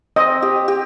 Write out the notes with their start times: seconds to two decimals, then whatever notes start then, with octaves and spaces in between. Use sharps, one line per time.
0.16 C4 D#5
0.42 G4
0.68 G4